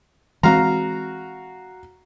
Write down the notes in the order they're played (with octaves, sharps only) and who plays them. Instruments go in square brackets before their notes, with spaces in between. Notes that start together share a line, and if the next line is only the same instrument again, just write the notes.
[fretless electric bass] E3 G#3 C4 [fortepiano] F#4 F5 A#5